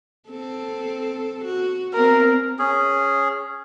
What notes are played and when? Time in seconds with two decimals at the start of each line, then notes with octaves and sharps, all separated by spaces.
0.29 C4 A4
1.45 F#4
1.94 B3 C4 A#4
2.59 C#4 G#4